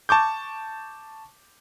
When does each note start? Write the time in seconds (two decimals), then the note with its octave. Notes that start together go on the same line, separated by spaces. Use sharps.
0.09 A5 C#6 D6 G6